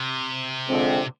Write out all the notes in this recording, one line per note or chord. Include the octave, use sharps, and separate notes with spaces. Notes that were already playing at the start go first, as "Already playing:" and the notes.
Already playing: C3
D3 F3 G#3 C4